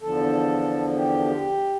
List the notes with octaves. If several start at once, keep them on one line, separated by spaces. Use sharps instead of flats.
E2 D3 F3 A4
G4